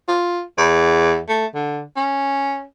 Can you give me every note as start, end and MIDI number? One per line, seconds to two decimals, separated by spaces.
0.09 0.42 65
0.58 1.20 40
1.29 1.46 57
1.55 1.82 50
1.96 2.64 61